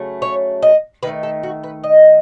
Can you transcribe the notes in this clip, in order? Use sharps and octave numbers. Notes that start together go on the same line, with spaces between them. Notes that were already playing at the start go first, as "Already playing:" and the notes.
Already playing: C#3 F#3 A3
C#5
D#5
D#3 A3 B4
A4
F#4
B4
D#5